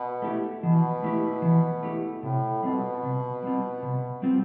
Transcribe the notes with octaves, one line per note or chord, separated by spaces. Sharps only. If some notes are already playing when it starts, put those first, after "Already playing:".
Already playing: B2
A3 E4 G4
B2 E3
A3 E4 G4
E3
A3 E4 G4
A2 C3
B2 G3 C4 F4
C3
G3 C4 F4
C3
G3 C4 F4